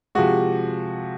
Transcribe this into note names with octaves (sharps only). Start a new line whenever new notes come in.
C3 F3 G#3 F#4